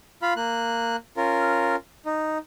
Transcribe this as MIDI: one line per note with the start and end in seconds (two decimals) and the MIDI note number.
0.22 0.33 65
0.22 0.33 77
0.22 0.33 83
0.36 0.96 58
0.36 0.96 90
1.17 1.76 61
1.17 1.76 65
1.17 1.76 70
2.06 2.38 63